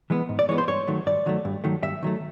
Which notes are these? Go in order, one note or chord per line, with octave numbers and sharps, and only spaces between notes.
E3 G#3 B3
G#2
D5
E3 G#3 B3 C#5
C5
G2 C#5
D#3 F#3 A3
G2 D5
D#3 F#3 A3
G2
D#3 F#3 A3
G2 E5
D#3 F#3 A3